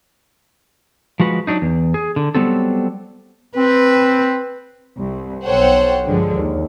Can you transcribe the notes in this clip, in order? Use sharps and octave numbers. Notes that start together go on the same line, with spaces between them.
F3 G#3 F#4 B4
F#3 D4 D#4
E2
G#4
D3
F#3 G3 B3 C4 A4
C4 B4
C2
B1 A4 C5 C#5 F#5 G5
G2 D3 F3 G#3
D#2